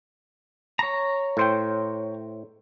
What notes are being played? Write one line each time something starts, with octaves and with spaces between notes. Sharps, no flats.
C#5 A#5
A2 C5 G5